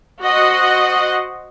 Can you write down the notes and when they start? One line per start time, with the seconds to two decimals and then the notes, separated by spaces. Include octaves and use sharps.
0.21 F#4 C5 D#5 F#5